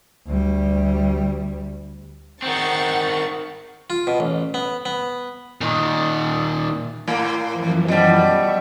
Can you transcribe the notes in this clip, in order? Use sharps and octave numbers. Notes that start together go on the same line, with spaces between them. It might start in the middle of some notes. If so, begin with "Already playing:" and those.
D2 G3
D#3 C4 F#5 C#6 A6
F4
B2
A1
B3
B3
A#2 D#3
A2 A#3 C6
F#2 E3 F3
B2 G3
E5 C#6